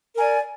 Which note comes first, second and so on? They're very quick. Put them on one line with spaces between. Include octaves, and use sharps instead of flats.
A#4 G#5 D5